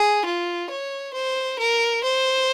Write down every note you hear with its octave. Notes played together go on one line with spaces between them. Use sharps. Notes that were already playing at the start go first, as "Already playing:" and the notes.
Already playing: G#4
F4
C#5
C5
A#4
C5